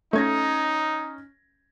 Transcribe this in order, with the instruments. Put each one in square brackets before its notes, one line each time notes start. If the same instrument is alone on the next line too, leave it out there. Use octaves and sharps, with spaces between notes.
[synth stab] A3 [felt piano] C#4 G#6 A#6 [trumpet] D#4